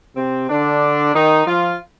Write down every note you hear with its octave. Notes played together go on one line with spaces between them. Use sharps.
C3 C4
D3 D4
D#3 D#4
F3 F4